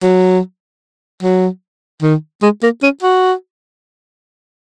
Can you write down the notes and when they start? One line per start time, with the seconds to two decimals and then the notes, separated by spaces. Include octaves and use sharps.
0.03 F#3
1.23 F#3
2.02 D#3
2.42 G#3
2.63 A#3
2.82 C#4
3.03 F#4